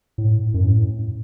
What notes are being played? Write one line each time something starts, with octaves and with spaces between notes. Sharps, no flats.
A2
F#2
A2